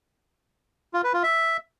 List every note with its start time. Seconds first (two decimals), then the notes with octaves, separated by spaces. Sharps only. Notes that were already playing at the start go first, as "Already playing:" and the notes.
0.94 F4
1.04 B4
1.14 F4
1.23 E5